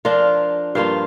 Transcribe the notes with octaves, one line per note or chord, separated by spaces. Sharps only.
F3 D4 F4 A#4
G2 F3 A#3 F4 F5